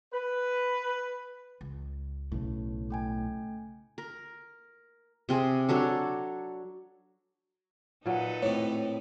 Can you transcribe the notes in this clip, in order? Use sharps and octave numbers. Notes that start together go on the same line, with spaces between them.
B4
C#2
B1 A2 C#3
A3 G5 G#5
A#4
C3 C4 G#4
F#3 D4 A4 C#5
A#2 F#3 D#4 A4 B4
A2 C3 C#5